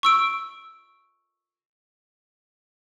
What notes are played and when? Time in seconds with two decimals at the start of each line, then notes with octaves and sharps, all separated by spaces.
0.03 C#6 E6 D7